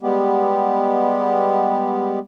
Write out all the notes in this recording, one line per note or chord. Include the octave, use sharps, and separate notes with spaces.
G3 G#3 B3 G4